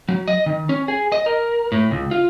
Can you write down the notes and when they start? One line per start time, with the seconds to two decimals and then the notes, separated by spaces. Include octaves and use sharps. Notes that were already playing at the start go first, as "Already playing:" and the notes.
0.09 F#3
0.28 D#5
0.46 D#3
0.69 C#4
0.88 G#4
1.12 D#5
1.26 A#4
1.72 A2
1.91 C#2
2.11 F4